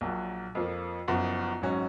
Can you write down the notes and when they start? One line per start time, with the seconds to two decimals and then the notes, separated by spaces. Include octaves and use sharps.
0.01 A#1 A#2 F#3
0.55 F2 F3 A#3
1.08 F#1 F#2 F3 B3 F#4
1.62 G#1 G#2 F#3 C#4 F#4